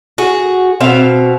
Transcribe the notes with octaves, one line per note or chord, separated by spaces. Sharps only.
F#4 G#4
B2 C4 E5 F5